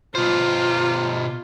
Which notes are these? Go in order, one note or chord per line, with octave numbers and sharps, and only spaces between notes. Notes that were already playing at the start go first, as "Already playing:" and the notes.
B2 F4 C5